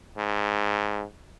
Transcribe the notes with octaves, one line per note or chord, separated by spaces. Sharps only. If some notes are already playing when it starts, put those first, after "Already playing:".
G#2